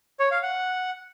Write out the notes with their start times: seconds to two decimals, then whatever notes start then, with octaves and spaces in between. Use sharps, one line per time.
0.20 C#5
0.31 F5
0.43 F#5